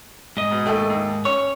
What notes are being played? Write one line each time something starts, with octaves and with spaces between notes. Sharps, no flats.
G#2 D#5
B2
D#2 A3
D#2
C#4 C#5 C#6